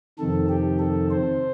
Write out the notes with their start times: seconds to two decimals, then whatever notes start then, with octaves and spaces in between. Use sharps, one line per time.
0.19 F2 C3 D#3 A4
0.49 G4
0.79 A4
1.10 C5